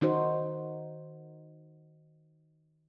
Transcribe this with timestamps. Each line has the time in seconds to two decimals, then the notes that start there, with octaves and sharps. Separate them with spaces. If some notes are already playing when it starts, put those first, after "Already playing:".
0.01 D#3 D#4 F#4 C5